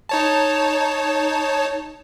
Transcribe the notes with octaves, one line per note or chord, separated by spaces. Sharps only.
D#4 C#5 A5